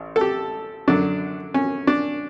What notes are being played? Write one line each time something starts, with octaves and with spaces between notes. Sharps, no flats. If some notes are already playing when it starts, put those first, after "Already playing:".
Already playing: A1
A4
G4
F#2 D3 F#3 D4
C#4
D4